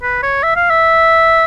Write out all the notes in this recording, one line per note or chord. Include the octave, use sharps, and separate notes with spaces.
B4
C#5
E5
F5
E5